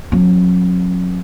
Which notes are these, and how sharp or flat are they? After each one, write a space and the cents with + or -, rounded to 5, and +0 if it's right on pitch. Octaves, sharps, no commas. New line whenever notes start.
F#3 -35 C#4 -45